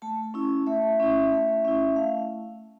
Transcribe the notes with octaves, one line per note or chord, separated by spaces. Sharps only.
A3 A5
C#4 E4
A3 E5
C#4 E4
A3
C#4 E4
A3 F5